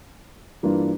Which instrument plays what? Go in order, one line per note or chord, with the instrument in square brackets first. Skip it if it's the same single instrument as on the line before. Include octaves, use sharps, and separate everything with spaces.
[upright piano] G2 E3 A#3 D4 F4